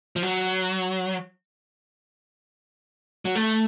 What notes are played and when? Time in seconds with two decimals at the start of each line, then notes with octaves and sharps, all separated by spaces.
0.16 F3
0.23 F#3
3.25 F#3
3.35 A3